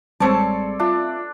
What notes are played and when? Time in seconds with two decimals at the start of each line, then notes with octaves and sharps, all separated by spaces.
0.20 A1 G3 G#3 C4 A4 C#5 D5 A5
0.80 D4 F4 E5